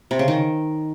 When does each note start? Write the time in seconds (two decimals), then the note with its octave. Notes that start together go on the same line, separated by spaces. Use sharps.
0.11 C3
0.19 C#3
0.28 D#3